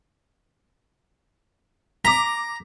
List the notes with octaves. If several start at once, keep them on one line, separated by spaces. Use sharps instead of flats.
A#5 D6 B6